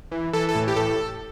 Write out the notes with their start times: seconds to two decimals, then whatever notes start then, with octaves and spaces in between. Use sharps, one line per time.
0.12 E3
0.33 E3 A4
0.49 A4
0.55 A2
0.68 G4
0.76 A2 A4